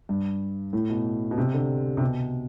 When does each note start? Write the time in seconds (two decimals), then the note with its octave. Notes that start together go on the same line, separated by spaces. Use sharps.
0.09 G2
0.73 A2
0.89 B2
1.31 B2
1.38 C3
1.54 D3
1.97 C3
2.01 B2